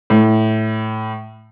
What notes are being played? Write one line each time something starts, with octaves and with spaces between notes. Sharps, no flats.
A2